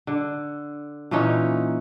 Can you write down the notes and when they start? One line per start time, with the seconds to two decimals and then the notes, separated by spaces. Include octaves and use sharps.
0.07 D3
1.11 A#2 E3 C#4 D#4